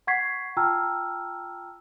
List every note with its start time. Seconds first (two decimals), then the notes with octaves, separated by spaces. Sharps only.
0.07 F#5 C#6 G#6 B6 C7
0.57 F4 G5 A5 A#5 E6 F6